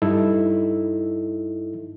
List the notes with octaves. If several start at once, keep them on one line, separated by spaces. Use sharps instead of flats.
G2 D#4 E4 A4